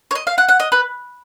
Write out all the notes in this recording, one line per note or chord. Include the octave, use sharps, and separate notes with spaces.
C#5
D#5
F5
F#5
F#5
D#5
B4